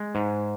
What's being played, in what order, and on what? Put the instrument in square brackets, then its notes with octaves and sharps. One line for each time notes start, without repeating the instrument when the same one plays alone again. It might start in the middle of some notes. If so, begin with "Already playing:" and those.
Already playing: [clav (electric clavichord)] G#3
G#2